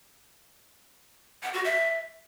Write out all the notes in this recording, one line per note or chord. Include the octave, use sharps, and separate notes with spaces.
F#5
F#4
E5